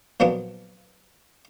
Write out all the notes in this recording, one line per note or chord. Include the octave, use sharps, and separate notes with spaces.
A#2 F3 F#3 B3 D4